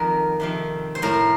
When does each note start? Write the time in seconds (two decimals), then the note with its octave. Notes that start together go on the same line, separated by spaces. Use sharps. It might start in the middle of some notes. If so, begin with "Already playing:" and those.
Already playing: F2 D#3 A#4
0.40 F2 C3 D#3
0.95 C5
1.02 A2 A#4